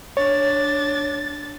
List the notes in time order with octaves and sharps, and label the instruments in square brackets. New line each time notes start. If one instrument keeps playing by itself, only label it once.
[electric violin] D4 A6 [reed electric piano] C#5